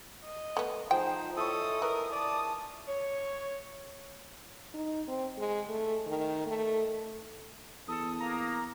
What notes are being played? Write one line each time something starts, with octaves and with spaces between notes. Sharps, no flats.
D#5
A3 B3
F3 D#4 G#4 C5 G5
E4 A4 C#5 D#5 D#6
A#4 B4
D5 A5 D#6
C#5
D#4
C4
G#3
A3
D#3
A3
E2 A4 D#6
A#3 A#5